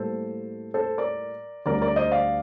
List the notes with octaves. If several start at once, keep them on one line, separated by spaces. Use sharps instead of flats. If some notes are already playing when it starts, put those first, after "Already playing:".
Already playing: A2 G3 A#3 A4 C5
A4 C5
A#4 D5
D2 D3 G3 C4 A#4 D5
A#4 D5
C5 D#5
D5 F5